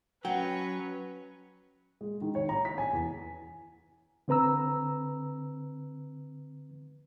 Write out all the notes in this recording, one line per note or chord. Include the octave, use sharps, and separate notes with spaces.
F#3 C#4 B4 C#5 F#5 G5
G#3
D#3
C#5
A#5
B6
G#5
E2
D3 C4 B4 A#5 E6